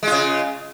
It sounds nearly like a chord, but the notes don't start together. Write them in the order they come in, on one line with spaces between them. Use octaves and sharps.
G#3 F4 C#3